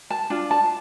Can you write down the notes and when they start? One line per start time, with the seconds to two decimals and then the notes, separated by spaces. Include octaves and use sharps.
0.10 A5
0.30 D4 F4
0.51 A5